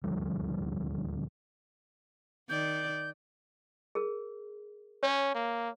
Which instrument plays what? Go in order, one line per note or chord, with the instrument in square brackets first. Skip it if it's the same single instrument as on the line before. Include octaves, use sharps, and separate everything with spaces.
[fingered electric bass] D#1 D2 F3 G3
[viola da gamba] D#3 D5 [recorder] G6
[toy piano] G#4 A#4
[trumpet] C#4 [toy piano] C#5
[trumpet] A#3